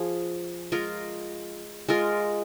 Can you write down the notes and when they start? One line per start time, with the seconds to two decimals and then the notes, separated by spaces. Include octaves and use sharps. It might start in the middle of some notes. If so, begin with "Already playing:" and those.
Already playing: F3 G#4
0.72 G#3 F4 A#4
1.89 G#3 F4 A#4